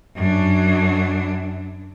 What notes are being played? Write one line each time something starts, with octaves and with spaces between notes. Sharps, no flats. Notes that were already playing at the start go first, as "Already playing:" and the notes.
F#2 D4